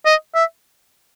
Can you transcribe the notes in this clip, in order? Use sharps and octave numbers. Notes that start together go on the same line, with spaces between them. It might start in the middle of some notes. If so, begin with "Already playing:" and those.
D#5
E5